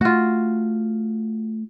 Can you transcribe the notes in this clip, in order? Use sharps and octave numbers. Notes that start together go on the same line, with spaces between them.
A3 F4 F#4